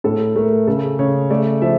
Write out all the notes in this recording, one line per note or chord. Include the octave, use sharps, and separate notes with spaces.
A2 A4
A3 A#4
C#3 A4
C#3 C#5
A3 D5
F3 E5